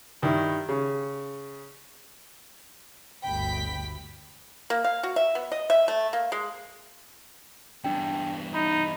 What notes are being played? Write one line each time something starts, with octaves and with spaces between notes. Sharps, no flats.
G2 D#3 E4
C#3
G1 D2 G5 B5 B6
A#3
F5
F#4
E5
B3
D#5
E5
A3
A#3
G#3
E2 G2 D4 G5
D#4 B5